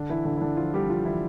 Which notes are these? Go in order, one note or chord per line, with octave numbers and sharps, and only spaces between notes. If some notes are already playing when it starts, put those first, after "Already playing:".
Already playing: D3 D4
E3 E4
D3 D4
E4
D3 D4
F3 F4
G3 G4
F3 F4
E3 E4